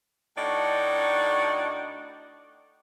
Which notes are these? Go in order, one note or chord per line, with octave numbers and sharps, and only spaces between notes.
A2 D4 D#4 F#4 D5